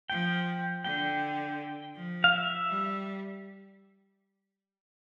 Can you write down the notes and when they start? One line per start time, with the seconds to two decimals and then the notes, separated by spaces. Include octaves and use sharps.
0.10 F3 G5
0.84 D3 G5
1.95 F3
2.24 F5
2.32 E5
2.69 G3